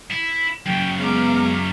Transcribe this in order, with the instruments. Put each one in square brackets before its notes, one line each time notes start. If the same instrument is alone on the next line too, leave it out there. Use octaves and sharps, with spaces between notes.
[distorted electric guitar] E4
[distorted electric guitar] F#2 C#3 [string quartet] G5
[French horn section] G#3 B3 [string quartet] F5 A#5 D6